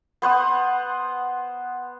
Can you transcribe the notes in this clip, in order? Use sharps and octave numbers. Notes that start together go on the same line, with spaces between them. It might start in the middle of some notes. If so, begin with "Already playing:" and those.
B3 C5 F#5 D#6